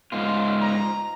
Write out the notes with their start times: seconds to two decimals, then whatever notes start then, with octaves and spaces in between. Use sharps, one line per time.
0.12 G#2 F4
0.61 A#5